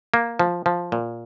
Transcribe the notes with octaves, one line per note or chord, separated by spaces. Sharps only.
A#3
F3
F3
A#2